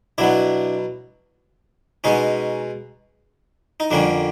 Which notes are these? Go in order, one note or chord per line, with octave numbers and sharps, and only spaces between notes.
B2 F#3 B3 D4 E4
B2 G#3 B3 C#4 D#4
D#4
F2 D3 G3 A#3 C#4 D4